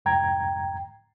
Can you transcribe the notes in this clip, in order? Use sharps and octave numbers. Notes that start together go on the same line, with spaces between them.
C2 F2 G#2 G5 A#5 G#6